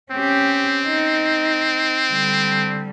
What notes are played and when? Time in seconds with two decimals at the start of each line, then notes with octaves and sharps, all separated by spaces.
0.12 C4 C#4 G4
0.87 D#4
2.12 D3 G3